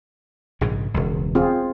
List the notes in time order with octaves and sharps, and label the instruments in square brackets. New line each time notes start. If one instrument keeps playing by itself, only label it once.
[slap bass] A#1 G#2 C#3
E1 C#2
[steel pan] C4 F4 G#4